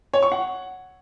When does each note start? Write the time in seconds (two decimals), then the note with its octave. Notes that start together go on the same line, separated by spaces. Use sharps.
0.13 C#5
0.23 C#6
0.32 F#5